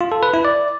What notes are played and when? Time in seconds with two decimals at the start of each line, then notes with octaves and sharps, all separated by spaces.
0.01 F4
0.12 A4
0.23 B4
0.34 E4
0.45 D5